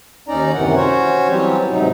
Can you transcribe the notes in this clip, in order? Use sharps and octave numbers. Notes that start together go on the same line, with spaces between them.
D#2 C#4 D#4 D5 A#5
F#2 C3 D#3 E3 F#5
C#4 F#4 C5 C#5
E3 F#3 G3 C4 G4
G#2 C3 F#3 D#4